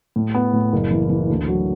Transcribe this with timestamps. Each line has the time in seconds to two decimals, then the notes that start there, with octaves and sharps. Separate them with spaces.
0.16 A2
0.35 B3
0.53 A2
0.73 F#1
0.91 E3
1.10 E3
1.29 D2
1.48 F#3